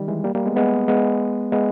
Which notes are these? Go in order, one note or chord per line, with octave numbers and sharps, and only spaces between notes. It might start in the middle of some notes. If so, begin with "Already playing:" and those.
Already playing: D#3 G3
E3 G#3
G3 A#3
G3 A#3
G#3 B3
G#3 B3
G#3 B3
G#3 B3